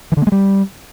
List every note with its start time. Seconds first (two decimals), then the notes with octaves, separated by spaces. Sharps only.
0.12 E3
0.17 D3
0.22 A#3
0.27 G#3
0.32 G3